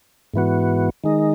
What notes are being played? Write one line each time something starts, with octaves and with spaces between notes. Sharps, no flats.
G#2 E3 B3 F#4
D#3 G#3 D#4